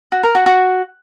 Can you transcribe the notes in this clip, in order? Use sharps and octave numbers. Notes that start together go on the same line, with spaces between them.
F#4
A#4
F#4
F#4